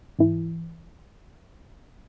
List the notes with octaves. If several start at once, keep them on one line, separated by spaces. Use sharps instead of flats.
G#2 E3